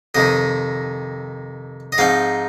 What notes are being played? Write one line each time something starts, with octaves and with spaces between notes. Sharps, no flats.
F2 C3 D#3 D#5
D#5
G#2 F3 C4 D#4 F5